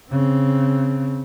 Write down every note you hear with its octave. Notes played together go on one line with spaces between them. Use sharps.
C#3 C4